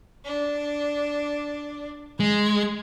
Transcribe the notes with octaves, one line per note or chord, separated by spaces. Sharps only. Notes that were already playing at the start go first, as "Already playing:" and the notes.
D4
G#3 G#6